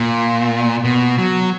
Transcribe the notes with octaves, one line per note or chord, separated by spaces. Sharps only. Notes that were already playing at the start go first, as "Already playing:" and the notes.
Already playing: A#2
B2
F#3